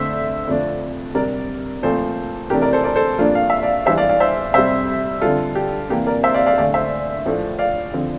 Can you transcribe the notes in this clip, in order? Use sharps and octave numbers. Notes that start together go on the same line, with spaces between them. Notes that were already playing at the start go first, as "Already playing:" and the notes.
Already playing: F2 D3 A3 C4 C5 E5
F2 D3 F3 A3 D4
C3 G3 D4 A#4 D5
A#2 F3 A3 C4 A4 C5
F2 C3 E3 A3 D4 G4 A#4
A#4 D5
A4 C5
A#4 D5
A4 C5
G2 F3 A#3 D4 F4 A4
F5
E5
D5 F5
E2 E3 G3 D4 C5 E5
D5 F5
D5 F5
C5 E5
F2 C3 G3 C5 E5
D3 G3 C4 F4 A4
G4
C3 E3 A#3 D4 G4
A#4 D5
C5 E5
D5 F5
D5 F5
E2 D3 A3 D5 F5
C5 E5
A2 F3 A3 D4
D5 F5
D3 F3 C4